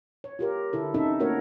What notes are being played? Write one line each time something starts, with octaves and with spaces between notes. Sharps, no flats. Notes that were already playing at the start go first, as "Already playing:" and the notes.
C#5
F4 G4 A#4
D3 E4 A4
C4 C#4 D#4 A4 E5
A3 A#3 C#4 F#4 A#4 C#5